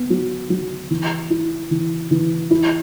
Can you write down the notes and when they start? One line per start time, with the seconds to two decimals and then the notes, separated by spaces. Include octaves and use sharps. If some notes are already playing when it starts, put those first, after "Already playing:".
Already playing: B3
0.10 F#3
0.50 F#3
0.91 E3
1.30 E4
1.71 E3
2.11 E3
2.51 E4